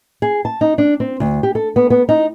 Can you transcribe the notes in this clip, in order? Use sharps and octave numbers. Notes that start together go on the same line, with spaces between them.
G#4
A5
D#4
D4
C4
D2
G4
A4
B3
B3
D#4